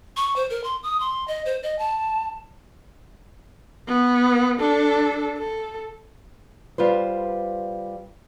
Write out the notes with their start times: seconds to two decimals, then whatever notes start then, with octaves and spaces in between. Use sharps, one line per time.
0.16 C#6
0.36 C5
0.50 A#4
0.64 C6
0.83 D#6
1.00 C6
1.28 D#5
1.45 C5
1.63 D#5
1.79 A5
3.88 B3
4.60 D4 A4
5.37 A4
6.78 G3 F4 B4 C5